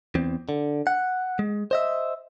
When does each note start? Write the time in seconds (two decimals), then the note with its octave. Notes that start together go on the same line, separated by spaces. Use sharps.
0.15 E2 C4
0.49 D3
0.87 F#5
1.39 G#3
1.71 C5 D#5 E5